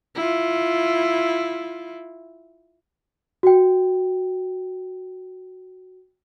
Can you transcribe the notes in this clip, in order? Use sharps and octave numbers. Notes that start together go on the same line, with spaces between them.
E4 F4
F#4 G5